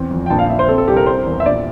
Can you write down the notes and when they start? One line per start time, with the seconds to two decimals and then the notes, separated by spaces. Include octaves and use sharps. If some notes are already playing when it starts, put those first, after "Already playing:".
Already playing: E2 C4
0.11 F2
0.26 G5
0.30 A#1 A5
0.39 F5
0.49 A#1 E5
0.59 C5
0.68 C4 A4
0.78 A4
0.88 C2 G4
0.97 A#4
1.06 C4 C5
1.26 E2
1.40 E5
1.46 A#1 D5